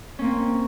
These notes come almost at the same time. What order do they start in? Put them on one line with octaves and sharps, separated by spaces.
C#4 A#3 C4